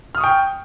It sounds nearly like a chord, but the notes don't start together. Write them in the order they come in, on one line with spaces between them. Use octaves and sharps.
F6 D#6 C#6 G5